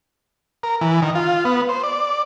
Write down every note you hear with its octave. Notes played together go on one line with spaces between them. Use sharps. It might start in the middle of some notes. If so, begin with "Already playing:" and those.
A#4
E3
D#3
F4
B3
C5
D5